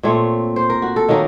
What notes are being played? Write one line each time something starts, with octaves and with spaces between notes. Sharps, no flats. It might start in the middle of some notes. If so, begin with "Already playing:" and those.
A#2 A3 C4 C#5
C5
A#4
F#4
A4
D#3 F#3 A#3 C#4 A#4